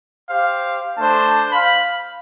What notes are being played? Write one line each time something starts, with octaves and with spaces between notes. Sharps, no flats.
G4 C5 F5
A3 D4 C5 A5
F5 B5